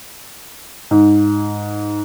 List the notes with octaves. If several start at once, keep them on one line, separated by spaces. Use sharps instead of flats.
G#2